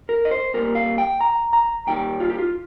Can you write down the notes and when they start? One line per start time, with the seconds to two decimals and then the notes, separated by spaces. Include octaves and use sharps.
0.09 A#4
0.25 D#5
0.31 C5
0.54 A#2 G3 A#3 A#4
0.75 F5
0.98 G5
1.21 A#5
1.53 A#5
1.87 D#2 D#3 G3 G5
2.20 F4
2.30 G4
2.38 F4